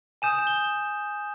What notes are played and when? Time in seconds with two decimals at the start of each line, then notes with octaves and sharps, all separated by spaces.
0.22 G#5 D#6 G6 E7
0.39 E7
0.47 G7